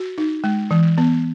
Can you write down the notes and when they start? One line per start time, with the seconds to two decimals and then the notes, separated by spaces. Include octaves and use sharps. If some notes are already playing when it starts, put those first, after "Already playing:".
Already playing: F#4
0.18 D#4
0.44 G#3
0.71 E3
0.98 B3